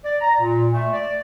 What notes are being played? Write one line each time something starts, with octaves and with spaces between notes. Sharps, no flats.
D5
A#5
A#2
A3
D5